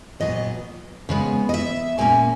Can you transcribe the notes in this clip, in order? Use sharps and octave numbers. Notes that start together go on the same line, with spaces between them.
A#2 F#3 B3 D#5
C#3 G#3 B3
D#5
E5
A#2 F#3 A#3 C#4 G#5